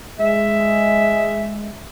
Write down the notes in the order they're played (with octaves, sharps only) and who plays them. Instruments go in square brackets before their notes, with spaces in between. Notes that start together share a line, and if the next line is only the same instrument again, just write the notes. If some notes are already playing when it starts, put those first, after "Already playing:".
[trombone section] G#3 [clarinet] E5